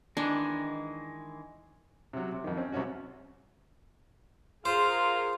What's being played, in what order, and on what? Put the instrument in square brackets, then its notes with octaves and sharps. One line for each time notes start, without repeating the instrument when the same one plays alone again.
[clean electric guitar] D#3 E3 G#3 [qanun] D4
[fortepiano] C3 F#3
C3
F2 D#3
C4 C#4
C2 C3 C#4 F#4
[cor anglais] F4 [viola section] G#4 A#4 [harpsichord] C5